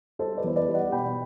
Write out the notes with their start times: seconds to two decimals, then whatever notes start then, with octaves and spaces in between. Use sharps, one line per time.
0.19 G3 A4 C5
0.37 B4 D5
0.44 E2 C5
0.56 B4 D5
0.68 G3
0.74 D5 F#5
0.92 B2 G5 B5